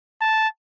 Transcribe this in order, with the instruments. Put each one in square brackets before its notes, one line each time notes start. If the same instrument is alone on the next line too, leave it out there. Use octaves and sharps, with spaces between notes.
[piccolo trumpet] A5